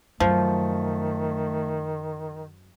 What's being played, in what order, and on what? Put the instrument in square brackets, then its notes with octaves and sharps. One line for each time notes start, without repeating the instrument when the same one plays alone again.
[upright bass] F#2 [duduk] D#3 [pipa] F3 [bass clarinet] A3